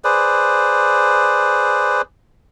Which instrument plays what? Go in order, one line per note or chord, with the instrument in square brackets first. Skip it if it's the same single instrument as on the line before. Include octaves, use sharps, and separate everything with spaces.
[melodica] G#4 B4 C5 D5